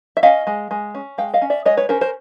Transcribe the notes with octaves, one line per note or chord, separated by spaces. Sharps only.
E5
C#4 D#5 F5
G#3
G#3
C#4
G#3 F5 G5
D#5 F5
C#4
D5 E5
G#3 C#5 D#5
B4 C#5
C#4 A#4 C5
A#4 C5